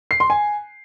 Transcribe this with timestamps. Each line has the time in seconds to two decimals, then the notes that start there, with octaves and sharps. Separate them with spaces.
0.11 C7
0.20 C6
0.30 G#5